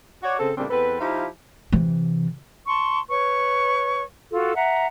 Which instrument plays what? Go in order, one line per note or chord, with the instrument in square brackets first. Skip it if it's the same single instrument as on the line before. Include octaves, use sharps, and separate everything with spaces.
[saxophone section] F#4 C#5 D5
C#3 C4 A4
A2 C#3 G3 A#3 C4 D4
E2 C4 A4 B4
F3 D#4 E4 G4 C5 F5
[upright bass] C3 E3
[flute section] A5 C6 C#6
B4 C#5 C#6
F4 F#4 A4
E5 F#5 A#5